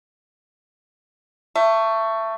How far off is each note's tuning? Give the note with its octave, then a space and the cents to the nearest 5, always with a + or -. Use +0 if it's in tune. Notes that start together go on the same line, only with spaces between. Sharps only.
A3 +20